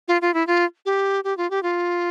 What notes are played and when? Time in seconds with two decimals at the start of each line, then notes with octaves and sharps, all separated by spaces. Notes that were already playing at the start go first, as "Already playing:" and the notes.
0.08 F4
0.22 F4
0.34 E4
0.47 F4
0.86 G4
1.24 G4
1.37 F4
1.51 G4
1.63 F4